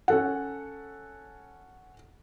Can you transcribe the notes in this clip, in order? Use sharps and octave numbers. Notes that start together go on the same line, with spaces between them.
C#4 A4 F#5